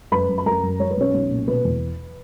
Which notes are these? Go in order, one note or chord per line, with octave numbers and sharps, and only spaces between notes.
F#2 B4 B5
F#2
B5
F#2 A#4 A#5
F#2
F#3 C#5
B4
B1 C#4 C#5
B1
A#2
B2 B4
E2